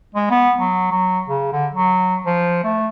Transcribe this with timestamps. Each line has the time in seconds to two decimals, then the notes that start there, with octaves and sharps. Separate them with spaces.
0.14 G#3
0.31 B3
0.59 F#3
0.91 F#3
1.28 C#3
1.52 D3
1.73 F#3
2.26 F3
2.64 A3